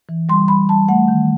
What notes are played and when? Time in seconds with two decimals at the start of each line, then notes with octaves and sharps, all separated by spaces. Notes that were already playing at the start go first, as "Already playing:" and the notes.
0.09 E3
0.29 G3 C6
0.48 G3 B5
0.69 G3 A5
0.88 A3 F#5
1.08 D#3